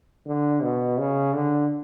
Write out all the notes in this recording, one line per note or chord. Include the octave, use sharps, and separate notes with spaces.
D3
B2
C#3
D3